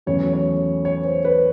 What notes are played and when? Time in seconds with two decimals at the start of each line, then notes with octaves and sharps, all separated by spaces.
0.06 E2 C#3 F#3 A3 C#5
0.33 C#5
0.85 C#5
1.04 C5
1.25 B4